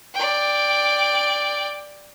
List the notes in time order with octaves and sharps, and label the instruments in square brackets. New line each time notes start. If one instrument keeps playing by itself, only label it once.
[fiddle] D5 G5